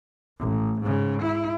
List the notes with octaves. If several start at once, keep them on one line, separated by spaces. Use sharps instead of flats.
A1
G#2 C#3
E4